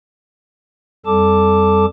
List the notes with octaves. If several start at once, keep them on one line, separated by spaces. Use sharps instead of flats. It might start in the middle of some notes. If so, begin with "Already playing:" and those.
F2 G3 A4 A5 D6